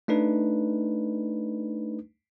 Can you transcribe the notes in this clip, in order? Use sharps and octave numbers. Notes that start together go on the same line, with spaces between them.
A3 D4 D#4 B4